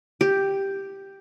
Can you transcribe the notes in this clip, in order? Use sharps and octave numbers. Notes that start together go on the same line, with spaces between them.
G4